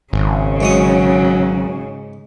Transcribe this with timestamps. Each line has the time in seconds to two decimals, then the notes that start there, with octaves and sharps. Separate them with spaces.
0.13 G#1 C#3
0.61 G#2 F#3 C#4 D#6